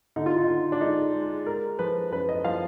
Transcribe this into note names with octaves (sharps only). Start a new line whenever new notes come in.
D3 D#4
F4
D#4
D3
D4
G#3 D#4
G#3
G#3 A#4
F3 B4
F#2 B4
D#5
F3 F5